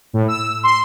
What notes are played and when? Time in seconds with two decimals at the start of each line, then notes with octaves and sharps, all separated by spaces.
0.13 A2
0.28 E6
0.63 C6